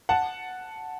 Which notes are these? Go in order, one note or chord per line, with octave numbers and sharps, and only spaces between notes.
F#5 A5